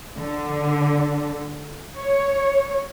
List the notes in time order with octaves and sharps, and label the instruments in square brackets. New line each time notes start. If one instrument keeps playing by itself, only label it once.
[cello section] D3
C#5